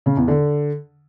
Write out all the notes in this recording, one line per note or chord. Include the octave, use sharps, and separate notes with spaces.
C#3
E2
D3